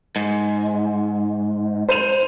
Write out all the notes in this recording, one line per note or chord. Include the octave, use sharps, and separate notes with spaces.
G#2
C5 D#7 F7